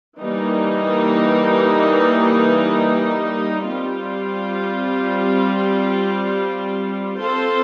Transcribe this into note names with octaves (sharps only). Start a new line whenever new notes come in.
E3 G3 A#3 D#4
G3 C4 F4
C4 F4 A4 C5